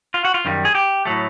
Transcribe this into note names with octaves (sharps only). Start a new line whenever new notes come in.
F4
F#4
F4
F#2 D#3 G3
G#4
G4
A2 F#3 A3